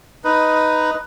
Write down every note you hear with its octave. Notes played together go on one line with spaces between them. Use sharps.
D#4 B4